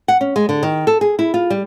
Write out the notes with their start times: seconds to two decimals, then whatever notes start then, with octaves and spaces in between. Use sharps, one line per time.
0.08 F#5
0.21 C#4
0.36 G#3
0.49 D3
0.63 D#3
0.87 A4
1.01 G#4
1.19 E4
1.34 F4
1.50 G3